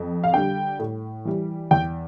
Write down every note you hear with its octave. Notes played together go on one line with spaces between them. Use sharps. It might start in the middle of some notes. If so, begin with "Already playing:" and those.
Already playing: F2
F5
D3 G3 G5
A2
E3 G3
E2 G5